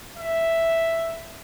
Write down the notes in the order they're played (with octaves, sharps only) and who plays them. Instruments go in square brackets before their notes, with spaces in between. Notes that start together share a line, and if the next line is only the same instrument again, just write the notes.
[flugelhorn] E5